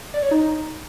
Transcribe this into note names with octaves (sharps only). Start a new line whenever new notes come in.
D5
C#5
D#4